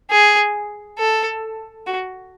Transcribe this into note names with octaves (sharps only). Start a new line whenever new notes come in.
G#4
A4
F#4